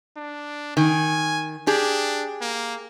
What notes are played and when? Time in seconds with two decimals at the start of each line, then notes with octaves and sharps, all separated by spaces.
0.17 D4
0.77 D#3 G#5
1.67 D4 G4 G#4
2.41 A#3